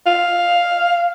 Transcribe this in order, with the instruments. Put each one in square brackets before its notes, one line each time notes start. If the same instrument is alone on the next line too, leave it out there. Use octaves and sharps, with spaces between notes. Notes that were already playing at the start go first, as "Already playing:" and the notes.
[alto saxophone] F5